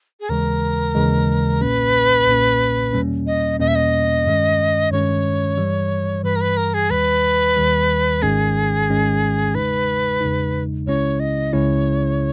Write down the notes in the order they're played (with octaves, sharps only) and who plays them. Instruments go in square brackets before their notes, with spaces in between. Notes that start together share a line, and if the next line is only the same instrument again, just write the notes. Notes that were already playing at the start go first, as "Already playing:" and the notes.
[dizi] G#4
[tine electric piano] D#2 C#3 E3 G#3 [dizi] A#4
[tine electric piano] D#2 C#3 E3 G#3
[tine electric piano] B1 A#2 A#3 C#4 [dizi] B4
[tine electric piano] B1 A#2 A#3 C#4
E2 B2 G3 A#3 C#4
[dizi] D#5
[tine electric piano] E2 B2 G3 A#3 C#4 [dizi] D#5
[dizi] E5
D#5
[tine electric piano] G2 D#3 G#3 C#4
[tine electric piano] G2 D#3 G#3 C#4 [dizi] C#5
[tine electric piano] G2 E3 G3
[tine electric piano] G2 E3 G3 [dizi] B4
[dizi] A#4
B4
A#4
G#4
[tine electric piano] D#2 D#3 G3 [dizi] B4
[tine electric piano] D#2 D#3 G3
[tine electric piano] G#1 G#2 D#3 G#3 C#4 [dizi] G#4
[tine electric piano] G#1 G#2 D#3 G#3 C#4
[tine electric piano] E2 C#3 G#3 D#4 [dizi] B4
[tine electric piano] E2 C#3 G#3 D#4
[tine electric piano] C#2 C#3 G#3 C#4 E4 [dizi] C#5
[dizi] D#5
[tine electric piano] C#2 C#3 G#3 C#4 E4 [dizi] C#5